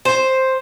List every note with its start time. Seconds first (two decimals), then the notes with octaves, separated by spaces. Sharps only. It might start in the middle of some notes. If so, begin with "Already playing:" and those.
0.05 C5